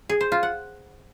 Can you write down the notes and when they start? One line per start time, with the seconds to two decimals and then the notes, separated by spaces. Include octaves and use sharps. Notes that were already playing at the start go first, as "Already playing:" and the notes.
0.09 G#4
0.21 C5
0.32 F4
0.43 F#5